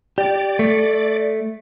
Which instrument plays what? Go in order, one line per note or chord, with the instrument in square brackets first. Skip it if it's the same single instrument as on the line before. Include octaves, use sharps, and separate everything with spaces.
[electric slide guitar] G4 [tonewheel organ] D5
[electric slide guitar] A3